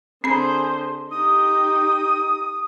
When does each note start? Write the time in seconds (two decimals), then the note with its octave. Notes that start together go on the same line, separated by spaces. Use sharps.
0.24 D3 C4 G#4 C5 B5
1.11 D#4 G4 D#6